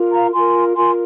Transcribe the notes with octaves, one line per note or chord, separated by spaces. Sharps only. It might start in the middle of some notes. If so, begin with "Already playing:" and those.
Already playing: F4 A#4
F5 A#5
F4 A#4 G#5 C6
F4 A#4 G#5 C6